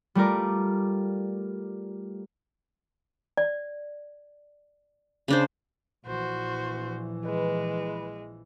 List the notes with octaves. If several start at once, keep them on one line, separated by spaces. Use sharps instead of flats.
G3 A3 F4 A#4 D5
D5
C#3 D4 C5
A#1 E3 F#4 C5
G#3 B4